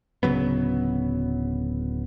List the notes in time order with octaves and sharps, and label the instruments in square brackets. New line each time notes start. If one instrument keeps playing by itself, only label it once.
[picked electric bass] D1 C#3 F#3 B3